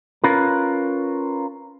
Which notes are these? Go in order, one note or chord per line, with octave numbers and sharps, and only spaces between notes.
C#4 F4 A#4 B4